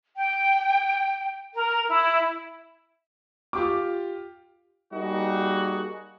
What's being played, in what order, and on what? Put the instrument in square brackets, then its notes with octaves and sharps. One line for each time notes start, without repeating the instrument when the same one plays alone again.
[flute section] G5
A#4
E4
[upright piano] F4 G4 D6
[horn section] G3 A#3 D#4 F#4 G#4